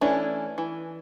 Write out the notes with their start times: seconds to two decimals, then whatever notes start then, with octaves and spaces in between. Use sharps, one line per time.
0.01 E3 A3 C#4 D4 E4
0.58 E3